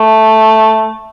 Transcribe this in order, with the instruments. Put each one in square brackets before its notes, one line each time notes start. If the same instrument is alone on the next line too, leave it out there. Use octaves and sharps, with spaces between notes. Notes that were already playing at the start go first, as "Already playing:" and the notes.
Already playing: [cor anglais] A3